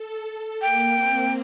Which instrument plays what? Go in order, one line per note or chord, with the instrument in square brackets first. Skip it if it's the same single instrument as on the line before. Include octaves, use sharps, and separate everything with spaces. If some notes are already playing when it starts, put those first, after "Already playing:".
Already playing: [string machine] A4
A4
[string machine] A#3 [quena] G5
[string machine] C4